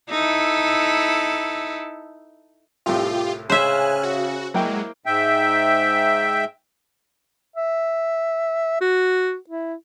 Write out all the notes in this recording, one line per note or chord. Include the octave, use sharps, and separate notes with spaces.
D#4 E4 A4
C2 A2 F4 G4
C#3 C5 E5 G#5 F6 F#6
F#4
F#3 G#3 A#3 E4 G5
G#2 E5 G5
E5
F#4
E4